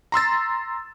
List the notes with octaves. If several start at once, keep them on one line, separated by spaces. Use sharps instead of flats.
A#5 C6 E6 A6